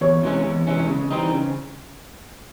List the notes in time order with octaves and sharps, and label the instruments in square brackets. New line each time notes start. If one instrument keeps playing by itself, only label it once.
[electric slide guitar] E2 [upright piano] C#5
[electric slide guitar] C3 E3 G#3 C#4
E2
C3 E3 G#3 C#4
C#3
E3 G3 C4 D#4
C#3